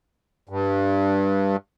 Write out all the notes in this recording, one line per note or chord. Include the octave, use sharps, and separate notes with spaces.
G2